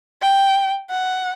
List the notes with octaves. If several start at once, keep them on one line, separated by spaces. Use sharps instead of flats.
G5
F#5